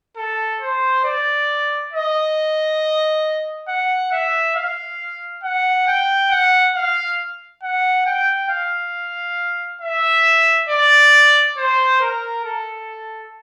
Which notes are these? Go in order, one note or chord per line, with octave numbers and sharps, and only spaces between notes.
A4
C5
D5
D#5
F#5
E5
F5
F#5
G5
F#5
F5
F#5
G5
F5
E5
D5
C5
A#4
A4